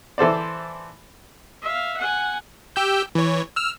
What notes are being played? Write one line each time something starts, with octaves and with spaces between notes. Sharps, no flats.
E3 A4 C5 D5
E5 F5
F#5 G#5
G4 E6 G6
E3 C#5
E6 F6